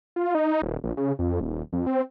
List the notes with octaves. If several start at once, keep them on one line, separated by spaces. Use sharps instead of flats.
F4
D#4
D#1
A#1
C#3
F2
D#1
F2
C4